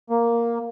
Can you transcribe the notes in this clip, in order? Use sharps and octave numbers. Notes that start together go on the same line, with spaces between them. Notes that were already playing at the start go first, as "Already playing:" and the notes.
A#3